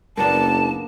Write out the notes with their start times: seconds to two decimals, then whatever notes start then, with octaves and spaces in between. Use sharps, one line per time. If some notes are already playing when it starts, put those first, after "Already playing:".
0.17 F#1 A#3 B3 D4 A5